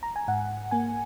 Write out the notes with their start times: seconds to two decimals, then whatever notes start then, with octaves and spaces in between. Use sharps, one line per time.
0.03 A#5
0.16 G#5
0.28 G#2 F#5
0.71 A#3 G#5